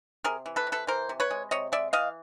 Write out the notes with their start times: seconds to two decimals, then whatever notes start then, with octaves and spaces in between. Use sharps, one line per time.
0.24 C3 G#4 A#4
0.46 E3
0.56 A4 B4
0.67 C3
0.72 A4 B4
0.87 E3 A#4 C5
1.09 C3
1.20 B4 C#5
1.31 G#3
1.51 C3 C#5 D#5
1.72 G#3 D5 E5
1.93 E3 D#5 F5